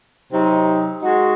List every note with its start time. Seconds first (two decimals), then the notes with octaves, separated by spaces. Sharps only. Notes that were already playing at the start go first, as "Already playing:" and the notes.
0.32 C3 F#3 C4 D#4
1.02 G#3 D#4 F#4